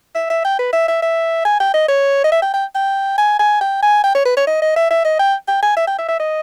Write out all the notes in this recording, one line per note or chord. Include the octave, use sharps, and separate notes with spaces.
E5
E5
G5
B4
E5
E5
E5
G#5
G5
D#5
C#5
D#5
E5
G5
G5
G5
G#5
G#5
G5
G#5
G5
C#5
B4
C#5
D#5
D#5
E5
E5
D#5
G5
G5
G#5
E5
G5
E5
E5
D#5